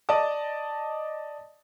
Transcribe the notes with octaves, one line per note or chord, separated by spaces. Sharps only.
D5 D#5 A5 D#6